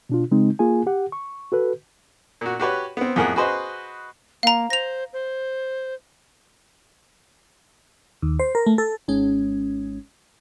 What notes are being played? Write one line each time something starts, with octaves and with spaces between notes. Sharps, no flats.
B2 D4 F4
C#3 G#3 C4 D#4
A#3 F4 G#4 G#5
G4 F#5
C#6
F#4 A4 B4
A#2 F#4
F#4 G4 B4 C#5
B3 C4
F2 A2 G#4 A#4 F#5
F#4 G#4 B4 C5 D#5
A#3 F5 A#5
C5 A#6 F7
C5
D#2
C5
A#4
A3
A4
G#1 G#3 C#4